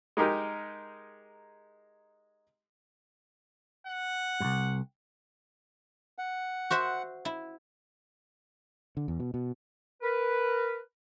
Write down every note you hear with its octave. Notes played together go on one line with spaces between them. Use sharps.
G#3 D#4 G4 A#4
F#5
C2 G2
F#5
F#4 C5 E5
E4
D3
E2
B2
B2
A#4 B4